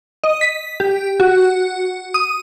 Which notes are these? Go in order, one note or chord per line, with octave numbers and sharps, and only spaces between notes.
D#5
B6
G4
F#4
D#6